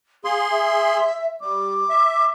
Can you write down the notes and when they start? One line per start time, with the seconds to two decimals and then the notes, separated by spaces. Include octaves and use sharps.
0.24 G#4 F5 C6
0.51 E5
1.41 G3 D6
1.90 E5